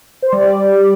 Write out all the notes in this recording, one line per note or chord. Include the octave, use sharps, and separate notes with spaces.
C5
G3 D5